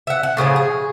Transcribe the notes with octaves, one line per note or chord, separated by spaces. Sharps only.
E5 F#5
F#5
A2 C#3 F3 G#4
G#4